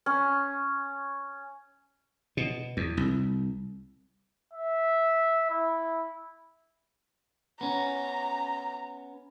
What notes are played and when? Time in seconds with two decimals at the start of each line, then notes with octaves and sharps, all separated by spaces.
0.06 C#4
2.37 B2
2.77 E2
2.97 C2
4.53 E5
5.50 E4
7.61 B3 C#4 A#5